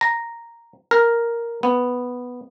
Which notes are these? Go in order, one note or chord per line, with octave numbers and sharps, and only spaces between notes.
A#5
A#4
B3